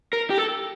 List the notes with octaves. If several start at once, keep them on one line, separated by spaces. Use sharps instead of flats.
A#4
G4
A4